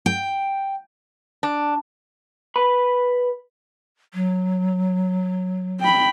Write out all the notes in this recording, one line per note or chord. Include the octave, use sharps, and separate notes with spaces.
G5
D4
B4 B5
F#3
G5 B5